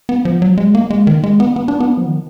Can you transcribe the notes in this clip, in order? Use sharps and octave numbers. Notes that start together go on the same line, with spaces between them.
B3
F3
F#3
G#3
A#3
G#3
D#3
G#3
B3
B3
D4
B3
F3
D#3